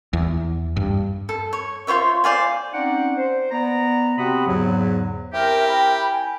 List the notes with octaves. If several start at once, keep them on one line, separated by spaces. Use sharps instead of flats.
E2
G2
A4
C#5
F4 C5 C#5 E5
C5 D5 F5 G#5
C4 C#4 D#4 D5 F#5 G5
C5
B3 D5 A#5
C3 C4 F#4 F#5 B5 D#6
E2 G#2 C#3 F#3
C4 E4 G4 A#4 E5
G5 B5
G#5